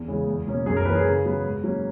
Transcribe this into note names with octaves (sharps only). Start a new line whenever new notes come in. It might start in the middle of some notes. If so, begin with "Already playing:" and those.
Already playing: E2
C#3 E3 G#3
E2
B2 A#3 C#4
F#2 G#4
A#4
E3 A#3 C#4 B4
G#4
C#3
F#3 B3
G#2
F#3 A#3 C#4